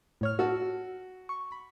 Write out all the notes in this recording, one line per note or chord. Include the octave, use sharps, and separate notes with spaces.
A2 C#5 F6
F#4 A5 E6
C#6
B5